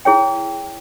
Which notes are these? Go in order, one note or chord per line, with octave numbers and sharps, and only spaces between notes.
E4 G#4 C#5 G5